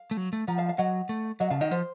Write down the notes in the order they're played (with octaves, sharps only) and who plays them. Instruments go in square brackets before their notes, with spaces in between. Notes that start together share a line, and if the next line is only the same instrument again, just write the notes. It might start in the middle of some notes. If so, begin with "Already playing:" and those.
Already playing: [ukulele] F5
[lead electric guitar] A3
F#3
A3
[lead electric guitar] F3 [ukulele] F#5 A#5
[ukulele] F5 A5
F5 A5
[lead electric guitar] F#3 [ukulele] D#5 F#5
[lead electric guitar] A3
[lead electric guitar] F#3 [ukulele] D#5 F#5
[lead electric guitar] C#3 [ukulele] F5 A5
[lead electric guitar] D#3 [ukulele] D#5 F#5
[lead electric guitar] F3 [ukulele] C5